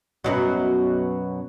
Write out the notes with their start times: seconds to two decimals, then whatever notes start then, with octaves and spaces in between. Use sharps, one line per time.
0.24 F#2 B2 F#3